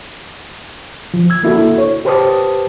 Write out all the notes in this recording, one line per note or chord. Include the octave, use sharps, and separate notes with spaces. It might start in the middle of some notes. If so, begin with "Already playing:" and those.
F3
E6 G#6
A#3 D4 E4 F#4 A4
C#5
G4 B4 C5 A5 D6 D#6